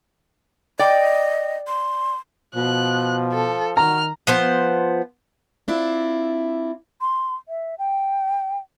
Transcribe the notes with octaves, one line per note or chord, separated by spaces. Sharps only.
D5 D#5 G5
C6
B2 F3 F#6
A4
D#3 F#4 A#5 F6
F3 B3 C5
C4 D4 E4 F4
C6
E5
G5